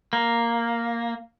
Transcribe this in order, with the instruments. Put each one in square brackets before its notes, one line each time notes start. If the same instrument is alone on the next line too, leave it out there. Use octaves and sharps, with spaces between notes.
[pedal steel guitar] A#3